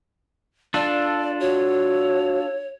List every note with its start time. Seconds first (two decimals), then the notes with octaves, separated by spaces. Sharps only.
0.74 D4 F4 A4 D5
1.40 F#4 C#5